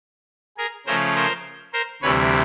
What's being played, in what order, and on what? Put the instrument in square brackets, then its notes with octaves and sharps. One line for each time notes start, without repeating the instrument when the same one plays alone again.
[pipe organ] G#4 A#4
C#3 F3 A3 C#4 A#4 C5
A#4 C5
A#4 C5
D2 C3 E3 G3 B4 C#5